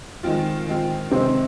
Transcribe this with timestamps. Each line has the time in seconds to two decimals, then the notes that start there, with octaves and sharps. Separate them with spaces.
0.23 D#3 G#3 C4 F4
0.67 D#3 G#3 C4 F4
1.11 C3 D#3 G#3 C4 D#4